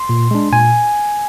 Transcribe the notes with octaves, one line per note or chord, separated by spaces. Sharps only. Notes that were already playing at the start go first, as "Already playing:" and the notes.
Already playing: C6
A#2
G#3 D4
A#2 G#5